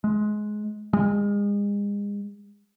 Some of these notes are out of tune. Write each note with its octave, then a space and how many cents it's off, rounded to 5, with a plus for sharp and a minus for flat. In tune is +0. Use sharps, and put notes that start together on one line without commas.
G#3 +20
G#3 -35